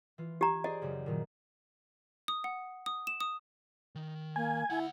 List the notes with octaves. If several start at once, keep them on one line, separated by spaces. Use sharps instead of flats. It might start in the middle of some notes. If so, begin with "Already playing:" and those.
E3 F4
G4 A#5 G#6
G#4 C5 D5 D#5
F#2 C#3 G4
A#2 D#3 F#3
D#6
F#5
D#6
E7
D#6
D#3
A#3 G#5
D2 E4 F#5